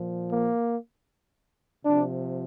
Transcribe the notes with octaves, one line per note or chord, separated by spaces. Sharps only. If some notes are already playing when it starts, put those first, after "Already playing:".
Already playing: A#2 F3
A#3
C3 F3 D4